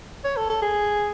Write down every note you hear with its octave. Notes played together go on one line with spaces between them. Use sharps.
C#5
A4
A4
G#4